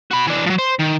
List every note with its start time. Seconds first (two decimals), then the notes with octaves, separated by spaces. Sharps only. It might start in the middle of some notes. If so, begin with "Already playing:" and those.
0.11 F#4 B5
0.27 E3 D4
0.46 F3 F#3
0.59 C5
0.80 D#3